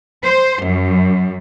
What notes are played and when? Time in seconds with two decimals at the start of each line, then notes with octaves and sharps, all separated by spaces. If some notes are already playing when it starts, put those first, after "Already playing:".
0.25 C5
0.63 F#2